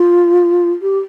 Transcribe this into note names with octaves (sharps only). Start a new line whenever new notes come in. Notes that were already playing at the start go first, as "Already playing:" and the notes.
Already playing: F4
G4